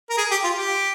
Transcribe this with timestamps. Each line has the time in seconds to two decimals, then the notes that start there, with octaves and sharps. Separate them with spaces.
0.10 A#4
0.17 G#4
0.31 G4
0.44 F4
0.57 G4